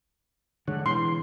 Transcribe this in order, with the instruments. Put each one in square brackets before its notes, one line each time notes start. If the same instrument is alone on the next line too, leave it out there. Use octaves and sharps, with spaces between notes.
[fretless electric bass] D3 G#3 [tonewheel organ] C#5 F#5
[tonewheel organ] B2 G#3 [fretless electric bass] E3 [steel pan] C6